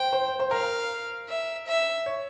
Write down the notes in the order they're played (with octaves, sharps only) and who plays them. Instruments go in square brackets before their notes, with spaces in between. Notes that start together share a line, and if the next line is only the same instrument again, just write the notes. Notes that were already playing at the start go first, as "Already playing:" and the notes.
Already playing: [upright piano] C5 [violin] G5
[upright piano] C5
C5
[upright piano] A#4 [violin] F5
[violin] E5
E5
[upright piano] C#5